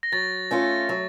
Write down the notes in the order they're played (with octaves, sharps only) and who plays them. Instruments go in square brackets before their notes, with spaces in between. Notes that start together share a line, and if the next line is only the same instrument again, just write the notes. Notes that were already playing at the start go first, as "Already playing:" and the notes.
[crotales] A#6
[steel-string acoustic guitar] F#3 [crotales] A6
[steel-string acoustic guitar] A3 C#4 F4
F#3